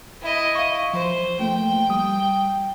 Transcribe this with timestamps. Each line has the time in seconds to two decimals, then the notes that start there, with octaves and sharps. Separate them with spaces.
0.21 E4 D#5
0.55 E5 F5 C#6
0.94 F3 C5
1.39 F3 A3 A#3 G5
1.90 G3 D#6